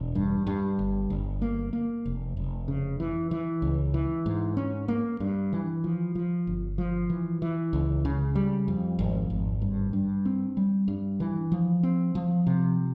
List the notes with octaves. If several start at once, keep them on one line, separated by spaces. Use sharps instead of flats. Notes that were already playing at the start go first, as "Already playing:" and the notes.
Already playing: E1
G2
G2
G1
G1
A#3
A#3
F1
F1
C#3
E3
E3
C#2
E3
G#2
C#4
A#3
G2
E3
F3
F3
G1
F3
E3
E3
C#2
C#3
G3
F2
G#1
G#1
G2
G2
C4
G3
G2
E3
F3
C4
F3
C3